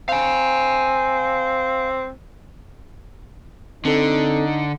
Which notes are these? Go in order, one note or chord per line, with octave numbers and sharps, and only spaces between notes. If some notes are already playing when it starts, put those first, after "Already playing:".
C4 F5 G#5
D3 C4 D#4 A4